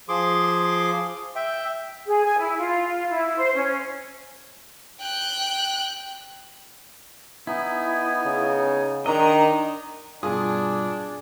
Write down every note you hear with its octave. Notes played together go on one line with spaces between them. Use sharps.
F3 G#4 C6 D6
E5 G5
G#4
G#5
E4
F4
E4
C5
C#4
G5 F#6
B3 D#4 E4 G#5
C#3
D#3 D4 D#5 A#5
G2 B2 D4 F4 G#4 D#6